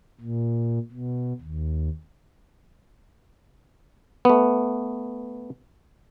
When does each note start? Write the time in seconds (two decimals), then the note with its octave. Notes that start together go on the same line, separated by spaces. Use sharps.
0.21 A#2
0.92 B2
1.41 D#2
4.25 A3 B3